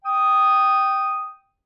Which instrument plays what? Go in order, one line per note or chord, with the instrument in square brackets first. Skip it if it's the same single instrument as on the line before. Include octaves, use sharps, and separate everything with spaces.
[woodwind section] G5 D#6